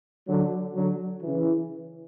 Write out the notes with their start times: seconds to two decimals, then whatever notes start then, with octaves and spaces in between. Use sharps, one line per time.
0.26 D3 F#3
0.74 D3 F#3
1.22 C#3 E3